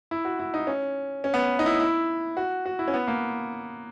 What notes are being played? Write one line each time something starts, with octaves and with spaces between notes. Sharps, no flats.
E4
F#4
E4
D#4
C#4
C#4
B3
D#4
E4
E4
F#4
F#4
E4
C#4
B3
A#3